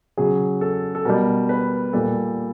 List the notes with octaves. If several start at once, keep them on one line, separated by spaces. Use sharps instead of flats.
C#3 F#3 G#4
A4
A4
B2 G3 A#4
B4
A#2 G3 A4